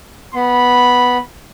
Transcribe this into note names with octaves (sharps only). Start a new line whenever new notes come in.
B3 B5